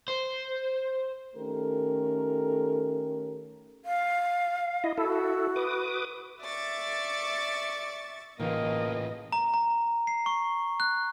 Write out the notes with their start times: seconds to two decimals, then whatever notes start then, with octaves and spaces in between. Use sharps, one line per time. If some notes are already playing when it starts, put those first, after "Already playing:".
0.08 C5
1.35 D#3 A3 C#4 G4 A4 A#4
3.85 F5
4.84 E4 D#5
4.98 E4 F#4 A4
5.56 B4 D6 D#6
6.43 D5 E5 C#6 A6
8.40 A1 A#2 C#3 E3 A#3 D#5 D#7
9.32 A#5
9.54 A#5
10.07 C7
10.26 C#6
10.80 F#6